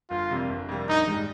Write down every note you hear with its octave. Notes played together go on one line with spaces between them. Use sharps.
G1 F4
F2 C3 G3 A#3
G1
F2 C3 G3 A#3
A#1 D#4
G#2 G3